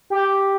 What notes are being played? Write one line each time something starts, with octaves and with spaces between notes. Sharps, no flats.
G4